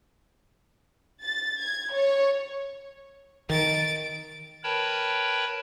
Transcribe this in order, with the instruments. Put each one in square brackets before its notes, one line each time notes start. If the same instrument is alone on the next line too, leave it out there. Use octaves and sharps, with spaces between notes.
[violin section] A6
G#6
C#5
[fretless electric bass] D#3 [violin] A6 D7
[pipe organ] A#4 B4 C#5 G5 A5 B5